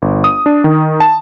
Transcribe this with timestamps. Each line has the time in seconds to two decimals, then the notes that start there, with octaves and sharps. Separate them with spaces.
0.02 G1
0.24 D#6
0.46 D4
0.64 D#3
1.00 A5